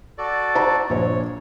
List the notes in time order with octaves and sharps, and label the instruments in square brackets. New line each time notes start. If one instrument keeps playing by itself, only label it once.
[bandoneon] F#4 A4 D5
[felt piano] C5 A5 A#5
[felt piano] A#1 C5 [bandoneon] C#5